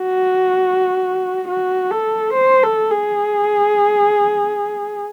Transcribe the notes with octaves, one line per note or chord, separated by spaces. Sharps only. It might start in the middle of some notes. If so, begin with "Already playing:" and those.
Already playing: F#4
F#4
A4
C5
A4
G#4